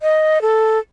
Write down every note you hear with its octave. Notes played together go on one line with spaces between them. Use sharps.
D#5
A4